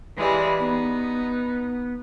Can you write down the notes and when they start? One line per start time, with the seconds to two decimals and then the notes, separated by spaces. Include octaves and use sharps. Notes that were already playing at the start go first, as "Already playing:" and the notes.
0.16 E3 G3 G#3
0.60 B3 D#4